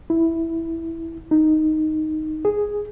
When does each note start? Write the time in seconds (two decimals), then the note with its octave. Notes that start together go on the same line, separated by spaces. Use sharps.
0.10 E4
1.31 D#4
2.45 G#4